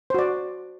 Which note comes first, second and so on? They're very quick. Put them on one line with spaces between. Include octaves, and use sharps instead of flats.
C5 F#4 D5